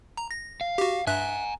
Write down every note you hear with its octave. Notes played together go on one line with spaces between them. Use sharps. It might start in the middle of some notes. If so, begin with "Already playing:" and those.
A#5
A#6
F5
F#4 G4
G2 E5 G#5 A#5 F#6